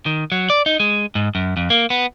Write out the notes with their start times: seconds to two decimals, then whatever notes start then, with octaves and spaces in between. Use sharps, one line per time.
0.06 D#3
0.32 F#3
0.50 D5
0.66 D#4
0.80 G#3
1.15 G#2
1.35 F#2
1.57 F2
1.70 A#3
1.90 B3